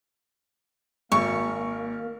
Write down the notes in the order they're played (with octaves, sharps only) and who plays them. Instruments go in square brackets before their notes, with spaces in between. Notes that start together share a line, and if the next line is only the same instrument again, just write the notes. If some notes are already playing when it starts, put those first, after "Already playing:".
[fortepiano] G#1 [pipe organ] A#3 A#4 [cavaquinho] C#6